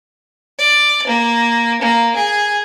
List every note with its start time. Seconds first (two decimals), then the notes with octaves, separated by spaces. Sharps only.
0.59 D5
1.07 A#3
1.82 A#3
2.16 G#4